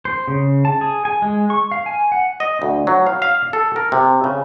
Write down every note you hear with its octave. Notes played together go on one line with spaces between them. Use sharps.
C5
C#3
A5
G#4
G#5
G#3
C#6
F5
G#5
F#5
D#5
D2
F#3
F5
F5
A4
A#4
C3
C#3